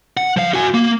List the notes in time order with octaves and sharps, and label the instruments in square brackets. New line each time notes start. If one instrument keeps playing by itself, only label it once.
[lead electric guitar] F#5
F3 F5
F#4 G#5
A#3